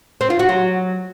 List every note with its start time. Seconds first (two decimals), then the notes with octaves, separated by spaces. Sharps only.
0.21 C4
0.30 F4
0.39 F#4
0.49 F#3